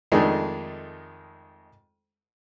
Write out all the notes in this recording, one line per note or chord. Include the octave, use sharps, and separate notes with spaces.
F2 D#3 G#3 A3 D4 D#4